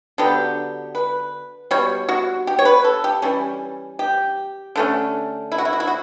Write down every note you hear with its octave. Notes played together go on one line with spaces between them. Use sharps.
D3 F#3 B3 G4
B4
B2 G3 C#5
F#4
G4
C#5
B4
A4
G4
E3 G3 C#4
G4
D3 A3 C#4
E4
F#4
E4
F#4
E4
F#4